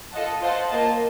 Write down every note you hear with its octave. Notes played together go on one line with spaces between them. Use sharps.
F4 A4 D#5 F#5 A5
F4 C5 D#5 F#5 A5
A#3 F4 C5 D#5 A5